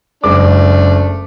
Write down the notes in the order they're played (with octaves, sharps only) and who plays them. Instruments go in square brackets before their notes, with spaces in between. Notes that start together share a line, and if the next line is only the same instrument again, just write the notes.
[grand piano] F#1 G#3 D6 [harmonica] A3 D4